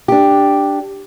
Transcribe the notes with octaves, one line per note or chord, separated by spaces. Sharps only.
D4 G4